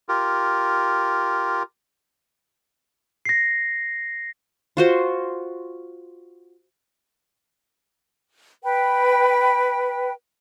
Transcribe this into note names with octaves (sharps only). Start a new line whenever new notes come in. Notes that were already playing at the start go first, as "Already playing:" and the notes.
F4 G4 A#4
A#6 C7
F4 F#4 C5
B4 G5